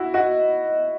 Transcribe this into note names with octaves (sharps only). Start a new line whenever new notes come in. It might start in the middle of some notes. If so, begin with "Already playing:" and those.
Already playing: E4 F#4
F#4 D#5